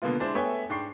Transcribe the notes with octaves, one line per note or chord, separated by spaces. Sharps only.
B2 D3 A#3 B3 F4
G#3 D4 E4 C5
A3 B3 C#5 E5 G5 G#5
G#2 D4 G5 C#6 C7